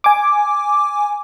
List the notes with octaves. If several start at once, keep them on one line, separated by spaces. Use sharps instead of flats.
G#5 D6